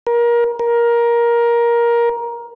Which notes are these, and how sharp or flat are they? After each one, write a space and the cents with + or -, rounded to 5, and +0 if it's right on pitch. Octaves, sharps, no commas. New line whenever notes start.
A#4 +25
A#4 +15